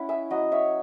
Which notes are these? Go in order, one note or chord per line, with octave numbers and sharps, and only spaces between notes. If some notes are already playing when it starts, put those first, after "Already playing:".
Already playing: C#4 E4 F#5
E5 G#5
F#3 D#5 F#5
C#5 E5